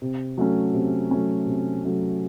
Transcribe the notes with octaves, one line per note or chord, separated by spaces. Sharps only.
C3
F#3 A3 C#4
C3
F#3 A3 C#4
C3
F#3 A3 C#4